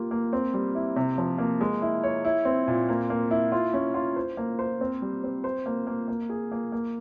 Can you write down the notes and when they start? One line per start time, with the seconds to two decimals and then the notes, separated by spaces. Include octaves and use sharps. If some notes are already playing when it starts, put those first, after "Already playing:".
Already playing: A#3 F4 G4
0.11 A#3
0.33 C4
0.54 G3
0.75 E4
0.96 C3
1.18 F3
1.38 A#3
1.61 G#3
1.82 E4
2.03 C#5
2.25 E4
2.45 C4
2.68 A#2
2.89 A#3
3.10 A#3
3.31 E4
3.52 F4
3.73 C#4
3.94 F4
4.16 C5
4.37 A#3
4.59 C5
4.81 C4
5.02 G3
5.24 C4
5.44 C5
5.66 A#3
5.87 A#3
6.08 A#3
6.29 G#4
6.52 A#3
6.72 A#3